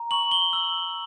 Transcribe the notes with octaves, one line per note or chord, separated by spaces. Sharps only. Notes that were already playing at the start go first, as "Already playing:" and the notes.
Already playing: A#5
C#6 F#7
G7
E6 F#7